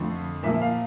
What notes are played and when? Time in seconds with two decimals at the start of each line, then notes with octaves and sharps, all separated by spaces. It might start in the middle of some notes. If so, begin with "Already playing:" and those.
Already playing: F2 D3 A3
0.43 A#2 F3 A#3 E5
0.62 F5